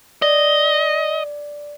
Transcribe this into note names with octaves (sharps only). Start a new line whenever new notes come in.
D5 D#5